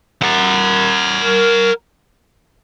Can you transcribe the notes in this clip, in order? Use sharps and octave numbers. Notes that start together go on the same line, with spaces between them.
A#4 F#5